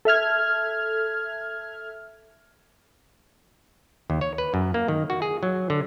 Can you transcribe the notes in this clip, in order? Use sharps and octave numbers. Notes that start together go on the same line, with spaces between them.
A4 E5 F6 G#6
D#2
C#5
B4
F#2
A#3
D#3
F#4
G#4
F#3
D3